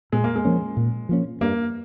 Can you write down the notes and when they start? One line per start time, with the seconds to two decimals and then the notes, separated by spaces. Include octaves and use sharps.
0.12 A#2 G#3
0.24 A#3
0.36 G#3
0.45 F3 A#3 C#4
0.77 A#2
1.09 F3 A#3 C#4
1.41 G2 A#3